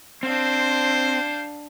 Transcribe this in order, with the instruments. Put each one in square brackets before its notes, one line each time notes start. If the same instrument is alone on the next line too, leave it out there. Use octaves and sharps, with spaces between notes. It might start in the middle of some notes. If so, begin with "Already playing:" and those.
[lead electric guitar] C4 [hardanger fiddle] D4 F5 [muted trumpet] C5